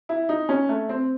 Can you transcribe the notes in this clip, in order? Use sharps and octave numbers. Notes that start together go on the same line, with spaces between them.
E4
D#4
C#4
A3
C4